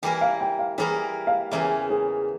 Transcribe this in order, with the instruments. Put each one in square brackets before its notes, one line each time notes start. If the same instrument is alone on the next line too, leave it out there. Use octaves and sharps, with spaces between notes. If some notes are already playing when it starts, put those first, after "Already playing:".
[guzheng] E3 G3 A#3 E4 A#4 [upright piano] G5
[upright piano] F5
G5
F5
[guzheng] E3 G3 A#3 E4 A#4 [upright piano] G#4
[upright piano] F5
[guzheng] E2 C#3 E3 A#3 [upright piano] E5
[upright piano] G#4